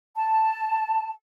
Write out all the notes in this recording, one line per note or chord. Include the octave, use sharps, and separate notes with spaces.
A5